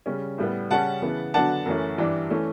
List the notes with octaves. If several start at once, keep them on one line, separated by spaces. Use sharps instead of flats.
C#3 G3 C#4
A2 G3 B3
C#3 G3 C#4 F#5 A5
C#3 E3 B3
D3 F#3 B3 D4 F#5 A5
F#2 E3 A3 C#4
G2 E3 G3 D4
E3 A3 C#4